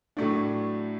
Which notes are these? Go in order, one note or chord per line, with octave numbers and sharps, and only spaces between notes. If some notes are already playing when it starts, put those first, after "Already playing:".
A2 F#3 A3 D4